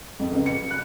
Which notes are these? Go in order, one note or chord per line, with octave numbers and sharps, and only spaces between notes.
F2
C#2
C#7
F#6